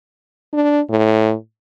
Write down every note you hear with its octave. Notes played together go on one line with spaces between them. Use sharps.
D4
A2